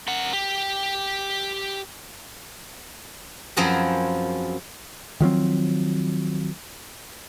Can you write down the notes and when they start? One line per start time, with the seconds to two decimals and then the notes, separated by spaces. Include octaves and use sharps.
0.08 A#4 F#5
0.33 G4
3.57 F#2 F3 C4 G#4 A#4 B4
5.20 D#3 F3 F#3 C4